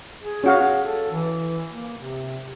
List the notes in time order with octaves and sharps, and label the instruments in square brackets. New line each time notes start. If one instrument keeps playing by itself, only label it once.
[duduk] G#4
[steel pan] C#4 F#4 F5 [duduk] G#4
[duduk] A4
E3
A#3
C3